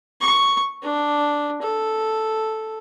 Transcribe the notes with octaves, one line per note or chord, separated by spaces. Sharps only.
C#6
D4
A4